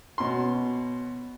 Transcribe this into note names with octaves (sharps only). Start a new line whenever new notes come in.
B2 C#4 C6